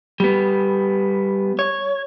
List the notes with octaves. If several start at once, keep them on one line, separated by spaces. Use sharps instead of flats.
G3 B3
C#5